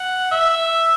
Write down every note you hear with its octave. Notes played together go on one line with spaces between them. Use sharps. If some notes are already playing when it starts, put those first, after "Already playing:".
Already playing: F#5
E5